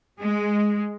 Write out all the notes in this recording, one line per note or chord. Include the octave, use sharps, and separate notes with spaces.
G#3